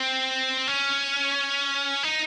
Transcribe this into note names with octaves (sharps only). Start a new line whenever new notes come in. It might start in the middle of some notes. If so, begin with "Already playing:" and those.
Already playing: C4
C#4
D#4